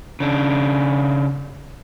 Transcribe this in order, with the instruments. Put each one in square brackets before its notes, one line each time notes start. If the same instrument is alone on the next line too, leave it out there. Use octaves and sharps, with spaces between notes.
[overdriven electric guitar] C#3 D4